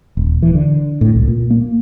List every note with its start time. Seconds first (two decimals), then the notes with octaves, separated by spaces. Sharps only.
0.17 D#1
0.42 E3
0.55 D3
1.01 A2
1.16 C2
1.28 A#2
1.50 A#3